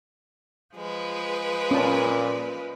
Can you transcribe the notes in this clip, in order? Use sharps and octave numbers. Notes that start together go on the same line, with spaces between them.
F3 G#3 B4
A#2 C#4 A5